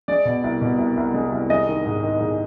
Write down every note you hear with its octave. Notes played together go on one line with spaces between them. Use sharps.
G#3 D5
B2
C2
B2
C2
C2
G#3
C2
G#3 D#5
D#3
G#2
D#3
G#2